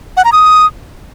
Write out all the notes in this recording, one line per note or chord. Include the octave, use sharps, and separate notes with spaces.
F#5
A#5
D#6